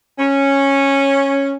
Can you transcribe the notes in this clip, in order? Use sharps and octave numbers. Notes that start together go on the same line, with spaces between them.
C#4